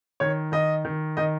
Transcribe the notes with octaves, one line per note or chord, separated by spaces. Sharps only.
D#3 C#5
D#3 D#5
D#3
D#3 D#5